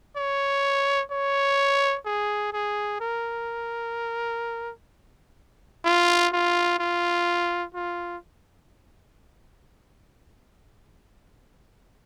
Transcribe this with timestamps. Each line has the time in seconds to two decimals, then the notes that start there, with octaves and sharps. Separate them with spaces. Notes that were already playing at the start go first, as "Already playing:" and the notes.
0.17 C#5
1.11 C#5
2.06 G#4
2.53 G#4
3.01 A#4
5.85 F4
6.33 F4
6.79 F4
7.75 F4